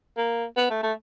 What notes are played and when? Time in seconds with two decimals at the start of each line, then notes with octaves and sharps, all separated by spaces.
0.17 A#3
0.57 B3
0.71 A3
0.83 A3